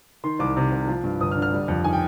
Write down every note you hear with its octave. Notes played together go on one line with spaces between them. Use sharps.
D#3 C6
C2 D6
C3
C2
F3
G2
G1 D#6
F6
D3
F6
G3
F2
D#3 G#5
G5